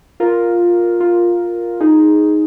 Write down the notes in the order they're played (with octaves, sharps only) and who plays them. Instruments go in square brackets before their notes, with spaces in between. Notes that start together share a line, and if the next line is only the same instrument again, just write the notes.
[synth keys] F4 A#4
F4
D#4 G#4